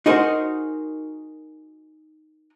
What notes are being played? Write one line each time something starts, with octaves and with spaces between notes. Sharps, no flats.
D#4 F#4 G#4 A#4 C5 D#5